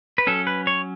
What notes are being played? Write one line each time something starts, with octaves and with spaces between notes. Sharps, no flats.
B4
F#3 C#4 A4
B4
C#5